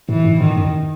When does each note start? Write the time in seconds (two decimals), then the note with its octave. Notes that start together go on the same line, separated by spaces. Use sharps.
0.09 A2 E3
0.24 G#2
0.40 A2 D#3
0.57 F#2